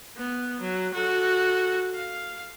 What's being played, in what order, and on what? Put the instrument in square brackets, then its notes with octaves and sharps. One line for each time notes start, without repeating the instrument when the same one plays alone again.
[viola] B3
F#3
F#4 A4
F5